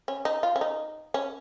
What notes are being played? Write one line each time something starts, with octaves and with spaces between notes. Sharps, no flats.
C#4
D#4
F4
C#4
D#4
C#4